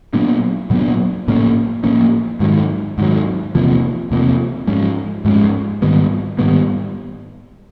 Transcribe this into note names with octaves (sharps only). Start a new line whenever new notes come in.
A#2 F#3 B3 D4
A#2 F#3 B3 D4
A2 F3 A#3 C#4
A2 F3 A#3 C#4
G#2 D#3 F#3
G#2 D#3 F#3
E2 C3 F3 A#3
E2 C3 F3 A#3
G#2 F3 G#3 C#4
G#2 F3 G#3 C#4
G#2 D#3 G3 B3
G#2 D#3 G3 B3